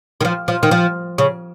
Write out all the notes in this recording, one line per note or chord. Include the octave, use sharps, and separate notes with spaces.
D#3
F3
F3
D#3
F3
C#3